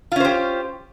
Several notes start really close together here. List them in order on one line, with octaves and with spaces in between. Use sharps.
F4 C#4 C5 G4